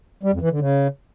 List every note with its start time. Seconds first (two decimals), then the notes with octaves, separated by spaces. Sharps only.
0.23 G3
0.32 F2
0.42 E3
0.51 D3
0.60 C#3